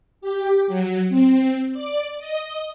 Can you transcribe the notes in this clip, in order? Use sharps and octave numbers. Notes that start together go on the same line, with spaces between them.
G4
F#3
C4
D5
D#5